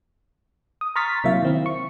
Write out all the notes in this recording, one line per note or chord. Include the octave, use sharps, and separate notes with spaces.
D#6
A#5 C6 C#6 F6 A6 B6
C3 F#3 A#3 E4 E5 F5
D#3 C4 E4
C#6